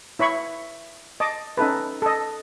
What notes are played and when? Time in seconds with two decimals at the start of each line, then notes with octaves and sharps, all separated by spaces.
0.19 E4 C#5 B5 C#6
1.20 D#5 A5 D6
1.57 C#4 D#4 A4 B4
2.02 A4 D#5